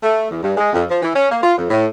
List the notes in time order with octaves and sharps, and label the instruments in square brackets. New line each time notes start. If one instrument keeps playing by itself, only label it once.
[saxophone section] A3
E2
G2
G#3
F2
F3
E3
C#4
A#3
F4
F2
A2